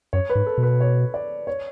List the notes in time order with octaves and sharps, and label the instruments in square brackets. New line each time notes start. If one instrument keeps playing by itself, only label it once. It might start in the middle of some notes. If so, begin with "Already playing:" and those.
[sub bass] F#2 [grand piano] C#5
[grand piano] B4
[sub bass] G#2
[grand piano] A4
[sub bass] B2
[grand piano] B4
C#5
D5
C#5